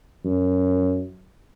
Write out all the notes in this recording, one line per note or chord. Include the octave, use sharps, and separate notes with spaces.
F#2